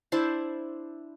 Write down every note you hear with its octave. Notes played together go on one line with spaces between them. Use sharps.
D4 E4 C5 A5